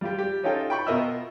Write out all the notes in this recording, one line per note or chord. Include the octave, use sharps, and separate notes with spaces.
G3 F4 G4
G4
C#4 D#4 F4 A4 G5
G5 B5 C#6
B2 F4 A#4 D#5 E5 E6